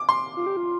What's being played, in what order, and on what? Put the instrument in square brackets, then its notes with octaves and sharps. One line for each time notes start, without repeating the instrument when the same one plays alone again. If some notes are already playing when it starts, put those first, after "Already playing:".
Already playing: [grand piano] D6
C6
[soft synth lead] F4
G4
F4